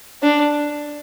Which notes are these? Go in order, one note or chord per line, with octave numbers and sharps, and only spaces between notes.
D4